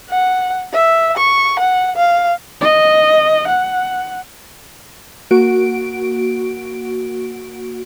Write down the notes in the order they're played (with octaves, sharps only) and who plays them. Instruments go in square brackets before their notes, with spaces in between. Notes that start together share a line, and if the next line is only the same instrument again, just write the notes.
[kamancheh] F#5
E5
C#6
F#5
F5
[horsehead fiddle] D#5
F#5
[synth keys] A#3 F#4 D7